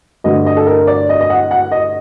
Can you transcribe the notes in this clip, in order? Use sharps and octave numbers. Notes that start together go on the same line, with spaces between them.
G2 D3 A3 D#5
D#5
A4
A#4
D5
D#5
D#5
F#5
F#5
D#5